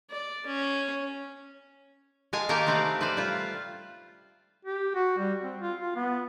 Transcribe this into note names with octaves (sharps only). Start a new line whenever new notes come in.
D5
C#4
G#3 F5 G#5 A5
D#3 A#3 D#4 G4 A#4 A5
C3 A3 C4 B4 F5
B4 C5 D5 F5
G3 F4
G4
F#4
G3
C4
F4
F4
B3